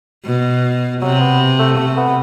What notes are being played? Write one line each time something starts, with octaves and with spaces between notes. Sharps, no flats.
B2
C3 F#3
B3
A3
C3 A3
B3